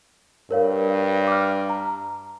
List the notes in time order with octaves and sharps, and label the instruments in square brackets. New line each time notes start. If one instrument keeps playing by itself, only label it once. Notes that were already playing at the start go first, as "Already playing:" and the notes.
[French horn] G2 [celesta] A#4 C#5 F5
[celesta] D6 F6
A#5